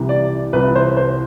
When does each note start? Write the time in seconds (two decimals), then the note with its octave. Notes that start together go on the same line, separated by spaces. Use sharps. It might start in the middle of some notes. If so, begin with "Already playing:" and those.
Already playing: C2 C3 E3
0.09 D5
0.53 C2 C3 E3 B4
0.75 C5
0.97 C5